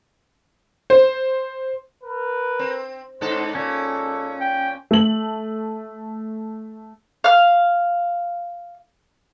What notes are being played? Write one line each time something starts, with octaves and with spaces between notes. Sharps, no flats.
C5
A#4 B4
C4
G#2 C#4 D#4 A4 C5
A#2 G#3 C#4 A4
G5
A3 F#7
F5 F6